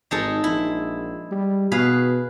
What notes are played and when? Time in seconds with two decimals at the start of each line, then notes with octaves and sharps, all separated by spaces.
0.11 G#1 G#3 D#4 A4
0.44 A#1 E4
1.31 G3
1.72 B2 G#4 B4 F5